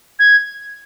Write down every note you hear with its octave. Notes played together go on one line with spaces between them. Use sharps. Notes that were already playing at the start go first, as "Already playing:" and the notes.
G#6